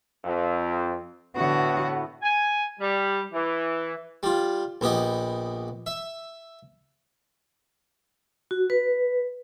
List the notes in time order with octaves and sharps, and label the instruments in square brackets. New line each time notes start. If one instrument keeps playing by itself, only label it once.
[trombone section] F2
[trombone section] A2 B3 [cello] D3 F#4
[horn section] G#5
G3
E3
[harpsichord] G3 F4
A#1 B3 G4 D#5
E5
[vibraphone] F#4
B4